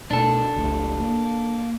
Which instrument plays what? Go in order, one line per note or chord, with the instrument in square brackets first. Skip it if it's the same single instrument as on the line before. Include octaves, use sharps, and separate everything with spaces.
[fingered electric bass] B2 A3 [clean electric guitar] D4 A4
[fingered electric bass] F#1 C#2 A3
A#3